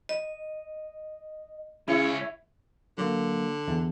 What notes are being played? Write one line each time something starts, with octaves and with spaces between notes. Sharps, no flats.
D#5
C#2 C#3 E4 C#5
D3 F#3 A#3
E2